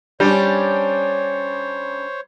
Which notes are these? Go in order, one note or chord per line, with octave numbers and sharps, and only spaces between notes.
G3 C#4 D4 C5 C#5